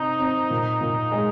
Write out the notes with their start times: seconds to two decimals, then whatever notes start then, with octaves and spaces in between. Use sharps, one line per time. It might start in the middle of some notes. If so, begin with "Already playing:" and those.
Already playing: C3 C4 D#4
0.20 C4
0.50 A#2
0.81 A#2
1.12 G#3